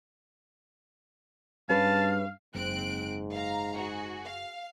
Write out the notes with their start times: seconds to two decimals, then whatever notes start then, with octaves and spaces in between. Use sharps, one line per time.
1.69 G2 C#4 G#4 B4 F5 A5
2.55 F#1 G#2 C4 F#6 D7
3.33 F5 A#5
3.76 F#4 G#4
4.25 F5